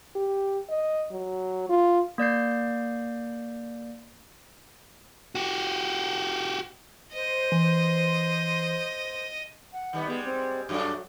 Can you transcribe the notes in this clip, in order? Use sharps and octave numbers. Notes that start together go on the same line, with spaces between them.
G4
D#5
F#3
F4
A#3 D5 G6 C7
F#4 G4
C5 D#5
E3
F#5
D#3 G3 B3
G3 G#3 B3
C4
F#2 F#3 A3 D4